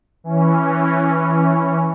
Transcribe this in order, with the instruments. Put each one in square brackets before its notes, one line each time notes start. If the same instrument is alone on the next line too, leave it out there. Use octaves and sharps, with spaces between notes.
[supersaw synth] E3 C#4